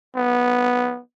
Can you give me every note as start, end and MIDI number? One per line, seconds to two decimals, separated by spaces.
0.16 1.01 59